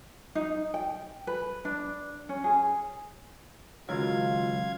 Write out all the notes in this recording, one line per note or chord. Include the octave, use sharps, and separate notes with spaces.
D#4
G5
B4
D4
C#4
G#4
C#2 D#3 F#3 F4 F5 G#6